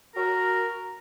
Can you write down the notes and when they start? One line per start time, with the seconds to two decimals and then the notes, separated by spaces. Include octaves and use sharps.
0.15 F#4 A#4